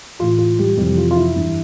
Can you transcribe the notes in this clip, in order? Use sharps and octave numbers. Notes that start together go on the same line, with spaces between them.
A2 E3 F4
F4
G3 G4
F2 C3 E3 G3 G4
F4
F4
E4
G2 E3